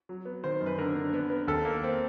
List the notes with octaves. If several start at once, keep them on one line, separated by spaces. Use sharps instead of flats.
F#3
B3
D#3 C5
F#2
B4
D3 A#4
D3
B3
B3
D#2 A4
A#3
C4